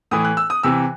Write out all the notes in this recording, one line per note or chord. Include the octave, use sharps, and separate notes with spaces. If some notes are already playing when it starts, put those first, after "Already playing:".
A2 E3 D#6
F#6
E6
D#6
C3 E3 E6